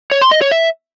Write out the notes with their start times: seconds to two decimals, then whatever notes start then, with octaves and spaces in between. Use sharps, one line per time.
0.11 C#5
0.21 C6
0.31 D#5
0.41 C#5
0.51 E5